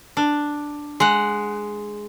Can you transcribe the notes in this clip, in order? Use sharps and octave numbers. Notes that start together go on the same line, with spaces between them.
D4
G#3 F#5